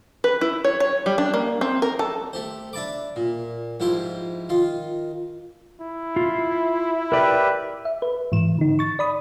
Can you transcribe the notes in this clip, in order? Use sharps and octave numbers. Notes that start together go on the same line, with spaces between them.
B4
E4
C#5
C#5
G3
D4
A#3
C4
A#4
A4
A3 G4 C5
D4 E5 A5 B5 D6
A#2
G#2 F3 E4 G4 C6
D#3 F4 C6
E4
F4
G4 A#4 B4 D5 E5
E5
B4
G#2 E3 E7
D3 D#4
C#6 A6
D5 B5 D#6